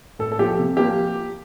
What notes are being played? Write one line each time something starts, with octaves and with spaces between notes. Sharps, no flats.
A2 A4
A4
F3 A3 G4
C3
F3 A#3 G4